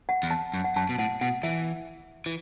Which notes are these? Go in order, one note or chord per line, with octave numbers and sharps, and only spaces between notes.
F#5
E2
A5
F#2
F#5
F#2 A5
B2
A2 F#5
B2 F#5
E3 E5
E3